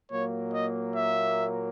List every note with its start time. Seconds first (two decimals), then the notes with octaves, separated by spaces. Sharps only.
0.12 A#2 F#3 A#3 C#5
0.54 D#5
0.96 E5